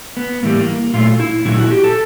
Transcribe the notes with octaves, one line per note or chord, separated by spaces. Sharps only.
B3
A2 E3 G3 A#3
A#3
A#2 F#3 A3 F4
E4
A#2 F#3 A3 E4
F#4
G4
A4